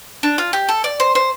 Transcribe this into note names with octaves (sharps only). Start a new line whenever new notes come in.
D4
F4
G4
A4
D5
C5
C5